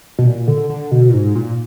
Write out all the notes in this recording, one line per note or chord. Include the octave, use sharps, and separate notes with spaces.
B2
A#2
D3
D3
B2
A#2
G#2
A#2